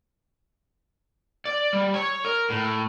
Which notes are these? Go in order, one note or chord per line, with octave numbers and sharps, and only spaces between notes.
D5
G3
C#5
A#4
A2